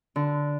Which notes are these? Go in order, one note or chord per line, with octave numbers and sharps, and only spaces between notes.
D3